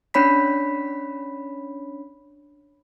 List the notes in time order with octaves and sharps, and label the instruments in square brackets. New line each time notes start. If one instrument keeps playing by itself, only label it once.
[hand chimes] C#4 D4 C#5 B5 B6